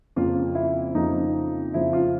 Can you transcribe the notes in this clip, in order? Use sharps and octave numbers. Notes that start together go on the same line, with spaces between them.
F2 C#3 F3 A#3 F4
E4
F2 C#3 F3 A#3 D#4
F2 C#3 F3 A#3 E4
F4